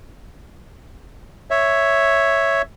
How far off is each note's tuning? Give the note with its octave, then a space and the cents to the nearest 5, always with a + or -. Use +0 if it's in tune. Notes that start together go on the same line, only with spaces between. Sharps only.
C#5 +0 E5 +0